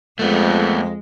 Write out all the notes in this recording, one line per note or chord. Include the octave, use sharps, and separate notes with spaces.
F2 G#3 A3 B3